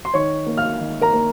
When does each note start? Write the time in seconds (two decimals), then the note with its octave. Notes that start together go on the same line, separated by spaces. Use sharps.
0.05 C6
0.14 D#3 C#5 C#6
0.47 A#3
0.57 F5 F6
0.80 D#3
1.01 A#4 A#5
1.13 A#3